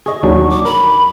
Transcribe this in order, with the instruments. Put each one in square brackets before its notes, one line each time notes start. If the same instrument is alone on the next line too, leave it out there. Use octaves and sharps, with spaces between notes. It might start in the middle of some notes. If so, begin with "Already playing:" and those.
[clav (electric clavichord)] G#4 D#5 [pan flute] C#6
[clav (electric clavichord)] D#2 F#3 D4
[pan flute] D6
[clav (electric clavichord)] A#4 [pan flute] B5